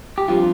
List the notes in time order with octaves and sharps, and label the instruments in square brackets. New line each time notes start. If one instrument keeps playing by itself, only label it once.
[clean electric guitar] G4
G2 F3 C4 F4